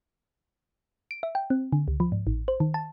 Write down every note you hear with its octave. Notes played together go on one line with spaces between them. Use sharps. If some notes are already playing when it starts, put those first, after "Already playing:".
D7
E5
G5
C4
D3
C#2
F3
G#2
A1
C5
D#3
A5